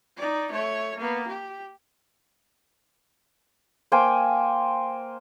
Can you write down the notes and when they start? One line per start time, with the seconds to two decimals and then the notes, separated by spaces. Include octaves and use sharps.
0.17 D#4 D5
0.52 A3 C#5
0.97 A#3 B3
1.28 G4
3.92 A#3 C5 G5 G#5